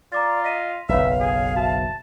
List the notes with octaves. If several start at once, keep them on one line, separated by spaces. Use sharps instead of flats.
F4 D5 A#5 D6 A6
D#5 A#6 B6 D#7
F#1 B1 B4 C#5 E5 F5
G#4
F#4 E5 A5